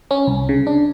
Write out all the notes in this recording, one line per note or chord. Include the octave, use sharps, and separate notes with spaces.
C#4
C2
C#3
D4